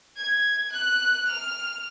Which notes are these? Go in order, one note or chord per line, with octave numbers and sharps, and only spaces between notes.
G#6
F#6
F6